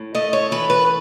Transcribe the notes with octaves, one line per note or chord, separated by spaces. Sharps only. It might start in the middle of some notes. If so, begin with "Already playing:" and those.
Already playing: A2
A3 D#5
C#5
E3 B4
B4